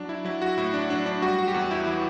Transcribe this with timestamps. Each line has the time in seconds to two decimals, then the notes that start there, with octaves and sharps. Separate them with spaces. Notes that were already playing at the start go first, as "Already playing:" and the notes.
Already playing: F#3 D4
0.09 E4
0.25 F#3 E4
0.42 F#4
0.58 A2 E4
0.74 D4
0.90 F#3 D4
1.06 D4
1.22 G3 F#4
1.39 F#4
1.48 G4
1.54 E2 F#4
1.71 E4
1.87 E3 E4